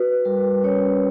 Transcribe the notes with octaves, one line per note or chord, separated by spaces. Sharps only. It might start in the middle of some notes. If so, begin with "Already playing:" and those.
Already playing: F#4 B4
G3 A#4
C#4 C#5